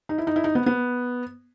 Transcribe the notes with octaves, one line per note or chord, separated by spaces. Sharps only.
D#4
E4
D#4
E4
D#4
B3
B3